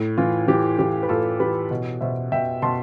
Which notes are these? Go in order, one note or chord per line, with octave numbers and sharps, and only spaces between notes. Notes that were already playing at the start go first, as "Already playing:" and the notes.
Already playing: A2
E3 F4
E3 G4
E3 G4
B4
A2 F4 A4
E3 G4 B4
B2
B2 C5 E5
B2 E5 G5
B2 A5 C6